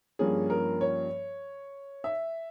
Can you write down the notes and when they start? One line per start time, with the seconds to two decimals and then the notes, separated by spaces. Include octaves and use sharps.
0.19 G2 F3 A#3 C#4 G#4
0.50 A#4
0.81 C#5
2.04 E5